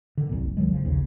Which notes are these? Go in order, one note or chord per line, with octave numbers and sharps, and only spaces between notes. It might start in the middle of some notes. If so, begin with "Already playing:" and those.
D3 D#3
C2 F#2 A#2
F#1
C#2 D#3 F#3 G#3
F#1 C#3 F3
A#1 D#2 C#3